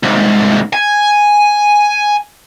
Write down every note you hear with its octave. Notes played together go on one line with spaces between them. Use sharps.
C2 G#2
G#5